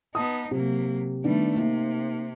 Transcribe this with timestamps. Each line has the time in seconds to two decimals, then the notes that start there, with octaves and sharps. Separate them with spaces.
0.15 B3 D#4 A5 D#6
0.51 C3 F#3 A#3
1.24 D#3 G3 A3 B3 D4
1.56 C3 A#3 D#4